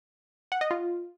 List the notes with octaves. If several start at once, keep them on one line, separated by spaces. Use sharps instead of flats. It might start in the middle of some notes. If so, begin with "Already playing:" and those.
F#5
D#5
F4